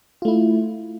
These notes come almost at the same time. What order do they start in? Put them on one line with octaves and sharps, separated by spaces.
F4 A3 E4